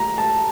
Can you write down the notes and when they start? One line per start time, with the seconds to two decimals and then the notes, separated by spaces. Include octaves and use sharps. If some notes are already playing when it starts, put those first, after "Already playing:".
Already playing: A#5
0.18 A5